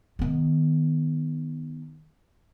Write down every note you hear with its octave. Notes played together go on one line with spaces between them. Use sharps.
D#3 B3